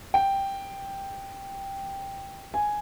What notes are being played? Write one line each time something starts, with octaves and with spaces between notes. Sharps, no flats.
G5
G#5